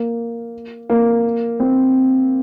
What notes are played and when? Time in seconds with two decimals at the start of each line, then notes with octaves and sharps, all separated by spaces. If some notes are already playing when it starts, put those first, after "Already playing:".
Already playing: A#3
0.90 A#3
1.60 C4